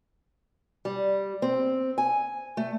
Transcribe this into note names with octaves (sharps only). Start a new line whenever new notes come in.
G3
C4
G#5
A3